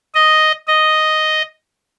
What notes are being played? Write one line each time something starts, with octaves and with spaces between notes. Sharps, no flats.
D#5
D#5